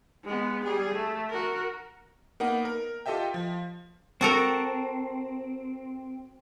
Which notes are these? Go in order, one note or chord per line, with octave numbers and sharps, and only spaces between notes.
G#3 B3
G3 G#4
A3
F#4 A#4
A#3 B3 D#4 F#5
A#4
F4 G4 A4 D#5 E5 G5
F3
C4 F#4 A4 A#4